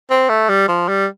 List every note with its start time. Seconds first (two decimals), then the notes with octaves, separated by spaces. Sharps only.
0.10 C4
0.29 A3
0.49 G3
0.68 F3
0.88 G3